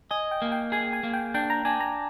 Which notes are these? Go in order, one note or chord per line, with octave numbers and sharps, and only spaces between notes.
D#5 G#5
G5
A#3
G5
G#4 G#5
G#5
A#3
G5
D4 G5
A#5
D4 G#5
A#5